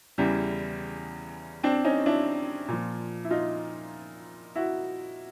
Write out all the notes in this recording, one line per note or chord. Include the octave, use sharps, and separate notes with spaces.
E2 C#3 E3 G3
C4 D4
C#4 D#4
D4 E4
A#2 F3
E4
D#4 F4
E4 F#4